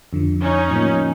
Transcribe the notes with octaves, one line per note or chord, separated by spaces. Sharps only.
F2 D3 F3
C#4 D#4
A2 F3 A#3